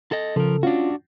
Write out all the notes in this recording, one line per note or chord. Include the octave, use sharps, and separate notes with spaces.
A4 D#5
C#3 F3 A4 A#4
C#4 D4 F4 F#4